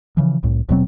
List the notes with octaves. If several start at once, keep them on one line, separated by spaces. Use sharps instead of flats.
C#3 E3 F3
C2 A2
D#1 B2 F#3 C4